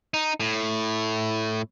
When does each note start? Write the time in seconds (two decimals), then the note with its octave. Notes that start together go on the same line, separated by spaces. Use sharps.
0.14 D#4
0.40 A2